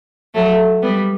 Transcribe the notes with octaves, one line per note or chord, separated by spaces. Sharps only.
F#3 A3
G3 B3